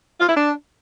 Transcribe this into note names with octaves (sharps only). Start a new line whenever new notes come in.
F4
E4
D4